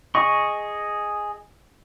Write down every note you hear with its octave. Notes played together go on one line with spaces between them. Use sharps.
G#4 D#5 C#6